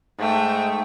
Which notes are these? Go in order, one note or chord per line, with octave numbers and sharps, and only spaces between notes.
G#2 A3 G5